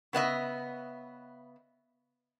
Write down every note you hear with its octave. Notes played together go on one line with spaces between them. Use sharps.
C#3 B3 D#5 E5